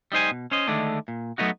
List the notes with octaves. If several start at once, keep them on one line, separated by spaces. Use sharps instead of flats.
G3 D#4 C5 G#5
B2
C#4 C5 D#5
D3 D#3 G#3 A3 D4
A#2
F#3 A3 B3 D#4 F#4